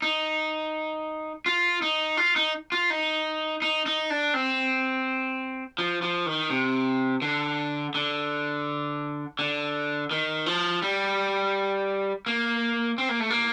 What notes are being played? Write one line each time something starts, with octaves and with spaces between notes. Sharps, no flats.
D#4
F4
D#4
F4
D#4
F4
D#4
D#4
D#4
D4
C4
F3
F3
D#3
C3
D3
D3
D3
D#3
F3
G3
A#3
C4
A#3
A3
A#3